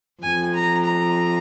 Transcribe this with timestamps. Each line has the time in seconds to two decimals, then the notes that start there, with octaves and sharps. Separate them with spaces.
0.22 F2 G#5
0.54 A#5
0.85 A#5